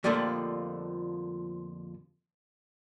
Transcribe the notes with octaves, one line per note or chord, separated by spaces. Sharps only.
F2 A#2 D3 F3 G3 A3